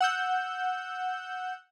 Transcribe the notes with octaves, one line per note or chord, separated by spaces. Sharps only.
F#5 E6 G6